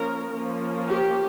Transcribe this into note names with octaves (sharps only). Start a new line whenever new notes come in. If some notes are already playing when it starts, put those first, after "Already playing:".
Already playing: F3 A#3 C#4 A#4
F3 A#3 C#4
G4